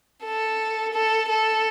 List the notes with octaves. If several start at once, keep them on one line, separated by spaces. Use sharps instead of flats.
A4
A4
A4